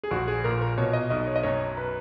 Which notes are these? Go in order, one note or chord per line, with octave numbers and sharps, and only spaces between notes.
G#4
A#1 F#4
G#4
A#2 A#4
A#4
B2 C#5
D#5
B1 D#5
C#5
D#5
F#2 C#5
B4